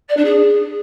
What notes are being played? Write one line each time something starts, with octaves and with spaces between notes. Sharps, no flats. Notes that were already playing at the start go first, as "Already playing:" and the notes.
D5
D4
G#4